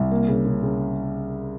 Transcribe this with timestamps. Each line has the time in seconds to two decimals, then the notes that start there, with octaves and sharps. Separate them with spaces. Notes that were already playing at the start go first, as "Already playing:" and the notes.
Already playing: C2
0.12 A#3
0.28 C#3
0.46 C#3
0.63 C#3